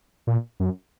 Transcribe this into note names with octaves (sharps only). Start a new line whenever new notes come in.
A#2
F#2